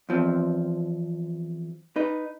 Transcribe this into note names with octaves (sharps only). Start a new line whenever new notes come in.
E2 F3 C4
D#4 B4